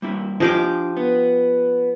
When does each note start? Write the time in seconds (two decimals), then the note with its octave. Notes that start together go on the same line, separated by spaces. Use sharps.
0.02 G3 A#3 E4
0.40 F3 D4 G4 D#5 G#5 D6
0.97 B3